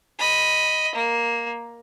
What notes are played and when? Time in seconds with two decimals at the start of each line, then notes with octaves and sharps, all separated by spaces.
0.19 D#5 B5
0.95 A#3